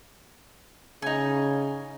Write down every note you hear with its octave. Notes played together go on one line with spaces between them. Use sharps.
C#3 D#4 G#5